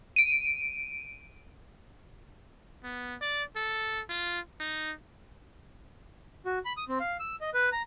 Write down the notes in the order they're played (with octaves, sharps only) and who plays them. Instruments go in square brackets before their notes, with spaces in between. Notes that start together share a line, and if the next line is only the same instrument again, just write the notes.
[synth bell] D7 D#7
[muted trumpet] B3
D5
A4
F4
D#4
[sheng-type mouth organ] F#4
B5
D#6
C4
F5
E6
D#5
B4
A#5